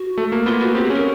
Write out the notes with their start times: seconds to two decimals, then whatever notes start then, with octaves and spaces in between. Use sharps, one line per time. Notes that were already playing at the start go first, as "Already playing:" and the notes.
Already playing: F#4
0.18 A3
0.32 A#3
0.46 B3 F4
0.60 F#4
0.75 C4 G4
0.85 G#4
0.90 C#4
0.95 A#4